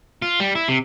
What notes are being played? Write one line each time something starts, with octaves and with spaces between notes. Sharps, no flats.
F4
G3
E4
C3